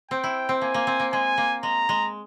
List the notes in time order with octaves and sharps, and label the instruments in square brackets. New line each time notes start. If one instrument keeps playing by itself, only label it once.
[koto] C4 [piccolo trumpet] G5
[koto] E4
C4
[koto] A#3 [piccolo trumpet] G#5
[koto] A#3
C4
A#3
[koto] G#3 [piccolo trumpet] G#5
[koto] A#3
[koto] G#3 [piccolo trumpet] A#5
[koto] G#3